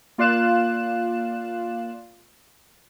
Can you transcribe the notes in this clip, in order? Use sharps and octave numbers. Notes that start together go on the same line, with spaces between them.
A#3 F4 D5 F5 F#6 E7